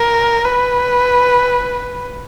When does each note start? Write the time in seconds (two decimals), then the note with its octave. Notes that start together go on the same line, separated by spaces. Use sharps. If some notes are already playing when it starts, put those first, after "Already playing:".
Already playing: A#4
0.45 B4